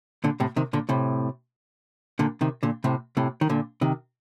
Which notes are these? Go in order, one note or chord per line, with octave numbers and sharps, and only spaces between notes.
A#2 D3
A2 C3
C3 D#3
A#2 D3
A2 C3
A#2 D3
C3 D#3
A#2 D3
A2 C3
A2 C3
D#3
A#2 D3
C3 D#3